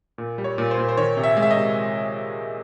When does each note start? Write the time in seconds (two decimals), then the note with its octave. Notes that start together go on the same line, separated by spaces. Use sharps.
0.18 A#2
0.38 G3
0.44 C#5
0.58 A#2
0.71 C5
0.78 A#2
0.89 C5
0.97 D#3 C#5
1.17 C3
1.24 E5
1.37 G#3
1.42 E5
1.51 D#5
1.56 C3